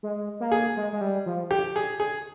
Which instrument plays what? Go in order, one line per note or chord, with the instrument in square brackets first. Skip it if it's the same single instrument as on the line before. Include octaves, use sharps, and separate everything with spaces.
[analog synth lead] G#3
A#3
[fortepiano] G#4
[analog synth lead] G#3
G#3
G3
F3
[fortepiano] G4
G#4
G#4